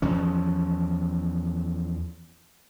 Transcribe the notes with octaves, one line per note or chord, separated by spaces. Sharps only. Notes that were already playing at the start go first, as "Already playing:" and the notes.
E2 F3 C#4